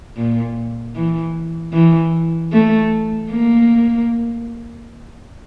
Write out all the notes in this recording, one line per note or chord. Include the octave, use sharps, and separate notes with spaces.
A#2
E3
E3
A3
A#3